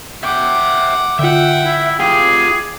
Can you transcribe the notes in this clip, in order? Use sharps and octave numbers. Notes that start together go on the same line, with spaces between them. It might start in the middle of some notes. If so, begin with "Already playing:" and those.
E5 F#5 G5 D6
D3 F4 E5 F#5 G5
E4
F4 G4 G#4 G5 D6